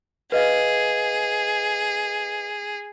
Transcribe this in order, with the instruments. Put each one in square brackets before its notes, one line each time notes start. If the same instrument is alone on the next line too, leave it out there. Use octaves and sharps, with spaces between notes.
[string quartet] G#4 [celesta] B4 D#5 F5